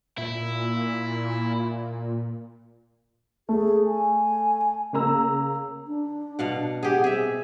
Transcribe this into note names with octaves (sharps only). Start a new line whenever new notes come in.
A#2 E4
A3 G#4
G#5
C#3 A#3 A#5 E6
D4
B2 F5 F#5
G4 G#4 F#5
C4 G#4 E5